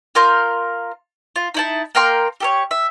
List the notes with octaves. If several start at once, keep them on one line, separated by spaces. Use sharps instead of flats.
F4 A#4 C6 G6
F4
D#4 E4 A5
A#3 A#4 G5 C6
G4 A4 C#5
E5